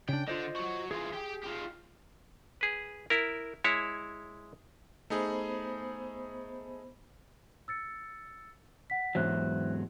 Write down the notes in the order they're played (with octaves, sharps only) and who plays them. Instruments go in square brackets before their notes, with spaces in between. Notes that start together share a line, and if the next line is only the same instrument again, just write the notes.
[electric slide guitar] C#3 D4 [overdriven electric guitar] G5
[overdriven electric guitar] D3 [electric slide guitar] F4 C5 D#5
[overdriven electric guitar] F#3 F#4
[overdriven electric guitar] E3 F4 [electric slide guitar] G#4
[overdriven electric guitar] G4 G5
F4 G4
[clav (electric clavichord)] G#4 B4
E4 A#4
G#3 E4 C#5
[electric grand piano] A3 D#4 G#4 [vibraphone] B3 C5 B5
[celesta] E6 A6 C#7
F#5 B6
[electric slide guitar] E2 G#2 F#3 [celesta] C5 E5 F#6